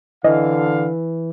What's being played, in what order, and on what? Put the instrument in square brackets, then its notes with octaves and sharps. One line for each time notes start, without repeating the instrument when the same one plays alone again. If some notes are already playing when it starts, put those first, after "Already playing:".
[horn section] D3 F5 [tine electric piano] E3 [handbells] D#5